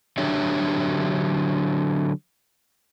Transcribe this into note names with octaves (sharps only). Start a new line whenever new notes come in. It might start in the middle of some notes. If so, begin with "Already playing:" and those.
D3 F#3 D4 G4 C#5 E5